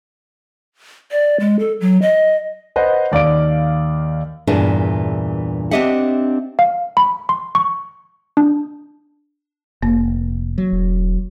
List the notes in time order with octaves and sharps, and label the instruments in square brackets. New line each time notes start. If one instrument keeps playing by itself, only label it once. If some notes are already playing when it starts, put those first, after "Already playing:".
[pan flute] D5
G#3
A4
F#3
D#5
[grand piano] B4 C5 D#5 F#5
D#2 D5 F5 D6 D7
[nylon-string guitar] E2 G2 A#2 E3 D4 G#4
C4 D4 G4 D#5 E5 F#5
[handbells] F5
B5
C6
C#6
D4
[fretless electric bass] F1 [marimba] A#3
[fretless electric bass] F#3
[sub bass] E1